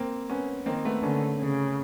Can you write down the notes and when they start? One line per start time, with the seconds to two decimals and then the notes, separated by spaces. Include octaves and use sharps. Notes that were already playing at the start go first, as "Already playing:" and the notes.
Already playing: A#3 C4
0.30 B3 C#4
0.66 D#3 A#3 C4
0.85 A3 B3
1.03 D3 B3 C#4
1.40 C#3